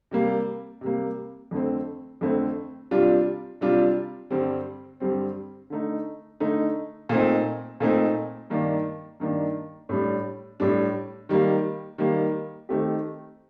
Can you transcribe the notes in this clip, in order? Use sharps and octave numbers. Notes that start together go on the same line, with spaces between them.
C3 G3 A#3
C3 G3 A#3
F2 D3 A3 C4
F2 D3 A3 C4
C3 G3 D4 F4
C3 G3 D4 F4
G2 D3 G3 C4
G2 D3 G3 C4
D3 A3 D#4
D3 A3 D#4
A#2 A3 C4 D#4
A#2 A3 C4 D#4
G2 D#3 A#3 D4
G2 D#3 A#3 D4
A2 G3 D4
A2 G3 D4
D#3 G3 A#3
D#3 G3 A#3
D#3 A3 C4 G4